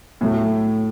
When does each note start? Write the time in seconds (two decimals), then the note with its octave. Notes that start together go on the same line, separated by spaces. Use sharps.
0.21 A2 F#3 A3